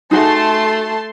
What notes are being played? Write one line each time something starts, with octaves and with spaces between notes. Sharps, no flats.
A3 D#4 F#4 G#4 A5 C6